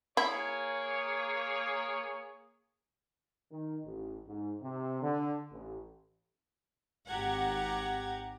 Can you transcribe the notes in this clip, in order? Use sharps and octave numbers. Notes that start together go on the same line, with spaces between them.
A#3 E4 G#4 C#5
D#3
A1
G#2
C3
D3
A1
G#1 G4 F#5 A#5 G#6